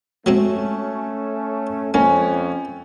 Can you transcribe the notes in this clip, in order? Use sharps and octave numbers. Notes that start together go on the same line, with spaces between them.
F#3 G#3 A3 C4 C#4
F2 A#3 C#4